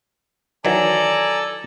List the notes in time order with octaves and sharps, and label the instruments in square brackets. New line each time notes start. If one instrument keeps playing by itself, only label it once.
[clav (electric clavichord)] D#3 E3 F#3 [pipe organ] A4 [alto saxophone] D5 [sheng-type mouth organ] G#5 A#5